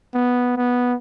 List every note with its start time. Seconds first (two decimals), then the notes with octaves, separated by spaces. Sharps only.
0.15 B3
0.57 B3